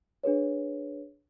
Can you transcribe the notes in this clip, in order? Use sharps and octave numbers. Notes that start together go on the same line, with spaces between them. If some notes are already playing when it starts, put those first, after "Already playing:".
D4 G#4 B4 C#5